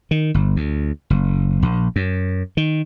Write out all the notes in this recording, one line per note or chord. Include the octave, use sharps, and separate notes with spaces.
D#3
G1
D2
F#1
A#1
F#2
D#3